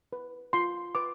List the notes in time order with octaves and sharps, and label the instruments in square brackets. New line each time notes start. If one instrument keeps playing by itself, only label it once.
[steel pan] B4
F4 C6
B4 D6